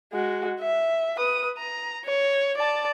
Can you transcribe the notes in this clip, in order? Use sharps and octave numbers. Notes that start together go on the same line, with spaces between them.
G#3 F#4
E5
B4 D#6
A#5
C#5
D5 A5